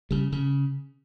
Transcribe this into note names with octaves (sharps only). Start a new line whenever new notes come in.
C#3 G3
C#3